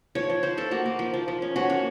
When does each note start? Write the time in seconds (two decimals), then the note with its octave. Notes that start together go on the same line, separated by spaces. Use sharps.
0.15 F3 C#5
0.30 F3
0.43 F3 C5
0.57 F3 A4
0.71 A#3 F#4
0.86 A#3
0.99 F3
1.14 F3
1.28 F3
1.42 C#4
1.56 C#4 F#4
1.70 A#3 F#4